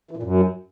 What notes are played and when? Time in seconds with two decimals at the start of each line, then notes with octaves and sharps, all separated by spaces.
0.11 E3
0.17 A#2
0.23 F#2